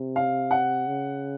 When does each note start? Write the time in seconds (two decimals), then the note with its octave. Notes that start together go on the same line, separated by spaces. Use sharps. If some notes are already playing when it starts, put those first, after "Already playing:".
Already playing: C3
0.16 F5
0.51 F#5
0.87 C#3